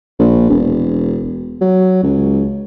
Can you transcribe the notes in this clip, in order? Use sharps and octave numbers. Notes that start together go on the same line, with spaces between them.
A#1
E1
F#3
C#2